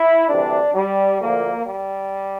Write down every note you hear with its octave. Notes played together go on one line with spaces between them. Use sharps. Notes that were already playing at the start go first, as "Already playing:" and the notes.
Already playing: E4
D2 C3 E3 G3 D4
G3
D2 D3 F3 A#3
G3